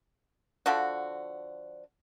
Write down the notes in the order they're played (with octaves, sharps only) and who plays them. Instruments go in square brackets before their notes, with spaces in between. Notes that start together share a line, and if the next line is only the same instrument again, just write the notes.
[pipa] D3 F3 F#4